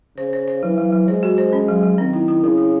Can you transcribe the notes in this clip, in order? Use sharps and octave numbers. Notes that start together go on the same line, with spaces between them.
C#3 C5
C5
C5
E3 F#3
F#3
F#3
G#3 C5
F#4
C5
C#4
F#3
F#3
D#3 C4
E4
E4
C#3 E4
E4